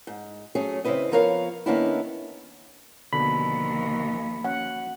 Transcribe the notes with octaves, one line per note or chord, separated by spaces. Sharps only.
G#2
F#3 A3 C#4 G#4
C#3 C4 E4 B4 D#5
F3 B3 A#4 C#5 D5 F5
D#3 A#3 B3 C#4 D4 E4
D#2 B2 D3 F3 B5
C#4 F#5